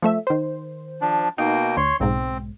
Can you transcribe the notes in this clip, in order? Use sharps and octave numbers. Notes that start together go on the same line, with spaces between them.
F3 A3 E5
D#3 C5
F3 D4
B2 A#3 D#4 G5
D2 C#5 C6
B1 G#2 C4